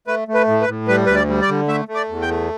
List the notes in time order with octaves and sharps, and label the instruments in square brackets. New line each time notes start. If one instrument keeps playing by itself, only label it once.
[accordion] A3 B4
A3
B4
A2
B4
A2
G3 B4
D2 B4
D5
G3
D5
D3
A3 E5
A3
D5
E2
G5
A3